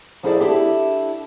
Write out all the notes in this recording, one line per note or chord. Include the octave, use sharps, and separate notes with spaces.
F3 D#4 E4 G#4 A4 D5
D4 E4 G4 A4 E5